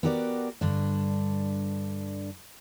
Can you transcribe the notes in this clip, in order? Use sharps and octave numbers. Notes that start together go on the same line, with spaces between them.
B3 F#4 G4 A#4 B4 D5
G2 D3 D4